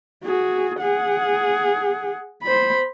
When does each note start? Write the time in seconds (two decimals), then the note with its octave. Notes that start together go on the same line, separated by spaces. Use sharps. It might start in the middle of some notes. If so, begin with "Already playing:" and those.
0.24 F#4 G#4
0.80 G#4 F#5
2.43 C5 B5